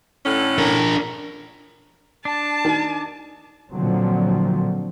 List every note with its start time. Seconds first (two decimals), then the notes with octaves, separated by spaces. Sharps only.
0.24 A2 D3 C#4
0.58 D4 A#4
2.25 D4 A5
2.65 D#3
3.71 A#2 D3 F3 F#3 C4